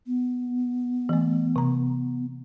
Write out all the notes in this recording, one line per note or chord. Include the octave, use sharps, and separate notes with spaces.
B3
E3 A3
C3 A#5